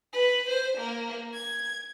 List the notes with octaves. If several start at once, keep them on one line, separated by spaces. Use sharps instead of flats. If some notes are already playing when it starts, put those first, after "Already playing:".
B4
C5
A#3
G#6